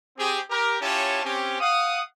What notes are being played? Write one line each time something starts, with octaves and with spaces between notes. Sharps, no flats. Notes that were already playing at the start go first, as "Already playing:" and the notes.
C4 G4 G#4
G4 A#4
C#4 E4 F4 G4 C#5 A5
C4 C#4 G4
F5 F#5 D#6